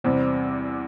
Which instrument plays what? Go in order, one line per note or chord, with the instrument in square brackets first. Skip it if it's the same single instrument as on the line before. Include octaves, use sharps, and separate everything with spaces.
[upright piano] E2 C3 G3 [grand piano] C4